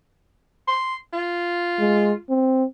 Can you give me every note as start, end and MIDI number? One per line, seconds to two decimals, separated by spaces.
0.67 0.95 84
1.13 2.21 65
1.79 2.13 56
2.30 2.64 60